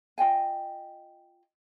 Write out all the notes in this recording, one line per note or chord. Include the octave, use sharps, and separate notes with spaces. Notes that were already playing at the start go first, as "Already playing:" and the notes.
F4 D#5 G5 G#5